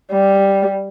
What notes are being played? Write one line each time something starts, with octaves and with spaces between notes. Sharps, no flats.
G3